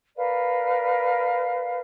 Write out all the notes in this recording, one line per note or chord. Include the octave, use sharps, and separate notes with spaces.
A#4 B4 D5 F5